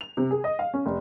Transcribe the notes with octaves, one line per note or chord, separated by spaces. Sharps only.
F7
C3
G#4
D#5
F5
C#4
F1